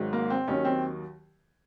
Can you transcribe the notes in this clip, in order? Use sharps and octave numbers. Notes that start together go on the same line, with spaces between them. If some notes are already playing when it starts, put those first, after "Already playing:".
Already playing: G#1 G#2 D#3 F#3
A#3
C4
D#2 D#3 F#3 C#4
C4